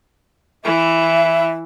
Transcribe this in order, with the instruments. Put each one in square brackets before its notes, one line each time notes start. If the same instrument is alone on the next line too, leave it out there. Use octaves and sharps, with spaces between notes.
[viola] E3 E4 [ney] E5